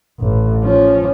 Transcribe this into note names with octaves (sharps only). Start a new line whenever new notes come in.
A1
F3 C#4